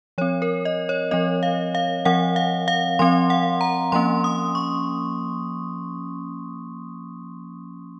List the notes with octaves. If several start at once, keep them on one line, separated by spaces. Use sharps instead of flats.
F3 C4 C#5
A#4
D#5
C#5
F3 C4 D#5
F5
F5
F3 C4 F#5
F5
F5
F3 C4 C6
F#5
A#5
F3 A#3 C#4 C6
D#6
C#6